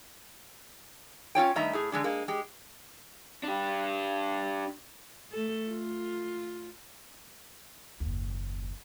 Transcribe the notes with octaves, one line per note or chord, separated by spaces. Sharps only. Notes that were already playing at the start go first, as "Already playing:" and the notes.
C#4 F4 C#5 G5
G2 D#3 A3 D#5 E5 A#5
A2 G#4
D3 G#3 D4
G#3 A#3
G#3 G4
D4 G4
A3 A4
F4
F#1 D#2